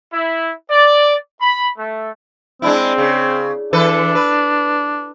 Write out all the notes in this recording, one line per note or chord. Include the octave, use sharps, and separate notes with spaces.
E4
D5
B5
A3
G#3 C4 D4 E4
C#3
E3 D4 A4 B4
B4